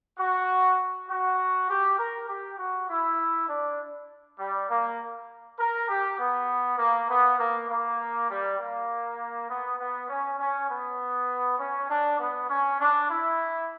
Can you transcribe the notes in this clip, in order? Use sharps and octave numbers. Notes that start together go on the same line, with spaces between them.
F#4
F#4
G4
A#4
G4
F#4
E4
D4
G3
A#3
A#4
G4
B3
A#3
B3
A#3
A#3
G3
A#3
B3
B3
C#4
C#4
B3
C#4
D4
B3
C#4
D4
E4